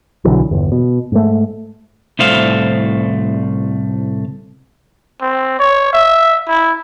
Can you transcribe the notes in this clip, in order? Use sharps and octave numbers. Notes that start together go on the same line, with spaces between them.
B1 D3 E3 F#3
G1 E2
B2
G#2 A3
C2 A2 A3 C5 F5
C4
C#5
E5
E4